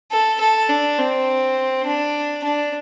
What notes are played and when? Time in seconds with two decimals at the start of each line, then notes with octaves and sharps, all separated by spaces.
0.12 A4
0.41 A4
0.70 D4
0.99 C4
1.86 D4
2.44 D4